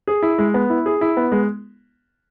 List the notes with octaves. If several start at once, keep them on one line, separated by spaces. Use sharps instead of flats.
G#4
E4
G#3
B3
E4
G#4
E4
B3
G#3